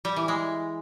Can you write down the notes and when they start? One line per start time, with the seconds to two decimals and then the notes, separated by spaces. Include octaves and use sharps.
0.05 G3
0.16 E3
0.28 G#3